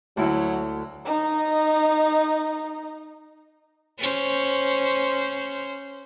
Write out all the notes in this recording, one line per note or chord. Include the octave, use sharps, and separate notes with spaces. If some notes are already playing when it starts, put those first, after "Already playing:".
D2 F#3 E4
D#4 D#5
C#4 C5